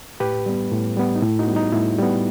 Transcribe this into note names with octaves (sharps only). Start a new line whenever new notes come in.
A2 G4 B4
G3 B3
A2
G3 B3
D#4
A2 E4
D#4 F#4
G3 B3
D#4
A2 E4
G3 B3